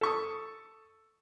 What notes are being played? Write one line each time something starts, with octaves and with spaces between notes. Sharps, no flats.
A4 C#6 D#6